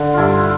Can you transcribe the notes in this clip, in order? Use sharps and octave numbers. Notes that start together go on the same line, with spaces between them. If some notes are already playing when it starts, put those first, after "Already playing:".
Already playing: D3
G2 D4 E4 F4
F4